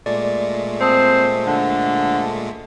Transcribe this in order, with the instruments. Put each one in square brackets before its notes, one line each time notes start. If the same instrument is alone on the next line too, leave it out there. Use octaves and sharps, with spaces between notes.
[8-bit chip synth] A#2 G#3 A3 [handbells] D5
[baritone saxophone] C4 [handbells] C5 A5 D#6
[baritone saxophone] D3